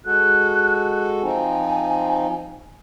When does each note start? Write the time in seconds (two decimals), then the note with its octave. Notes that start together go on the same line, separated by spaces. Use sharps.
0.06 G#3 F#4 A4 F#6
1.23 F3 C4 D#4 G#5